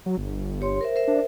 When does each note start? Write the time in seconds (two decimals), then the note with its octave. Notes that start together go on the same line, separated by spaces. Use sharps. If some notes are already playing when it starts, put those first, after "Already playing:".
0.06 F#3
0.18 G1
0.61 G4 C#5 C6
0.81 A#4 C5 E5
0.96 A#4 C5 E5
1.07 D4